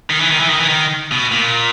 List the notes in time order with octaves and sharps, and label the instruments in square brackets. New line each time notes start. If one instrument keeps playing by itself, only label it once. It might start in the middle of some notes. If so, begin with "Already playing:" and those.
[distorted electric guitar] D#3
E3
D#3
E3
D#3
E3
D#3
B2
A#2